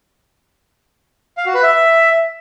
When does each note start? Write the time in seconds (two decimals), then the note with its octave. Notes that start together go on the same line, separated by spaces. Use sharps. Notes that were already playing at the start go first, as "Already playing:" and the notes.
1.37 F5
1.46 F#4
1.54 B4
1.63 E5